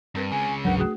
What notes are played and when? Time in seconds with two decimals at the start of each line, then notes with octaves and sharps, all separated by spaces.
0.15 G2 C4 A#4 B4
0.32 C#3 G#3 G#5
0.65 D#1 A1 F#3 D4 A#4 B4 F#5
0.78 A3 F#4 G#4